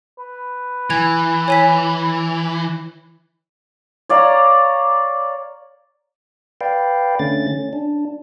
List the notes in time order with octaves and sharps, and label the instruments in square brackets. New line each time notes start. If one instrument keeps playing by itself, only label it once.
[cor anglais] B4
[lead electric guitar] E3 [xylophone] G#5 G#6 F7
[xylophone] C#5 G#5 B6
[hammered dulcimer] C#5 D5 F5 A#5
[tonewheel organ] B4 D5 F5 G5
D3 A3 C#4 A6
C#4
D4